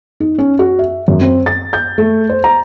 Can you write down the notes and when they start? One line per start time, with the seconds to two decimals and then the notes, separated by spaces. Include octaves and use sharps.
0.20 D#4
0.38 C#4
0.59 F#4
0.79 E5
1.08 F#2
1.21 C4
1.46 A6
1.73 G6
1.98 A3
2.29 C5
2.44 A#5